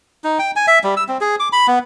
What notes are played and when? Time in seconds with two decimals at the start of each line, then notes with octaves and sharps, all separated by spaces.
0.24 D#4
0.39 G5
0.56 G#5
0.67 E5
0.84 G3
0.97 E6
1.08 C4
1.21 G#4
1.40 D6
1.52 B5
1.68 B3